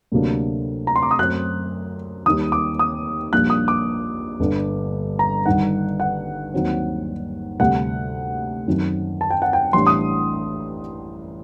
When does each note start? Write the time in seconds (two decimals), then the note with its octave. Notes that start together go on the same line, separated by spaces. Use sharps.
0.12 D2 C3 F#3 A#3 D4
0.87 A#5
0.96 C6
1.02 D6
1.11 D#6
1.19 F#2 F#3 A3 C4 F#6
2.26 D#2 D#3 G3 D#6
2.52 D6
2.79 D#6
3.32 A#1 A#2 G3 A#3 D4 F#6
3.50 D#6
3.68 D6
4.40 G1 G2 D3
5.19 A#5
5.46 G1 G2 D#3 F#5
6.00 F#5
6.54 D#2 D#3 F#3 C4
7.60 D2 C3 G3 F#5
8.67 F#2 D#3 F#3 C4
9.21 A5
9.31 G5
9.42 F#5
9.53 G5
9.73 A1 A2 G3 D4 C6
9.87 D#6